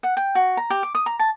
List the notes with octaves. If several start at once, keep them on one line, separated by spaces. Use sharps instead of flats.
F#5
G5
F#4
A#5
G4
D6
D#6
A#5
A5